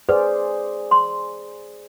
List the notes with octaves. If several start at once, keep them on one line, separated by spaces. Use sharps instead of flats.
G#4 B4 C5 D5
C6